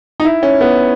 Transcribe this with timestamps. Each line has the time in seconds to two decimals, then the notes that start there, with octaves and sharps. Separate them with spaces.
0.20 D#4
0.25 E4
0.43 C#4
0.61 B3